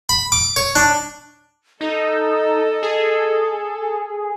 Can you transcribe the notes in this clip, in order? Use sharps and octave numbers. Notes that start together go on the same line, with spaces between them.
B5
D6
C#5
D4
D#4 A4 D#5
G#4